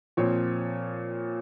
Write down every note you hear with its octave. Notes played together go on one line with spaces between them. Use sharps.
A#2 F3 C4 C#5